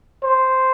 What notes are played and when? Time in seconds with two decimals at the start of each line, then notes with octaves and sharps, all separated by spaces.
0.23 C5